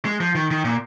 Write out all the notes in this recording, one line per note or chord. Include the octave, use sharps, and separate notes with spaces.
G#3
F3
D#3
D#3
A#2